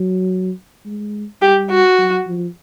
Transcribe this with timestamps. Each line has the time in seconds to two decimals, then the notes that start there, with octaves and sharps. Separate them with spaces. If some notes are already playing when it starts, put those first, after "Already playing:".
Already playing: F#3
0.85 G#3
1.42 G3 G4
1.70 F#4
1.99 F#3
2.27 F3